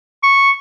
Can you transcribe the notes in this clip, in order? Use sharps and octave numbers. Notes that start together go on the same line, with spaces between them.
C#6